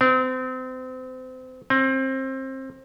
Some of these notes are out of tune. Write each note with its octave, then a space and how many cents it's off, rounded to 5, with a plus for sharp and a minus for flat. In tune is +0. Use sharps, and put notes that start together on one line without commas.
C4 -30
C4 +25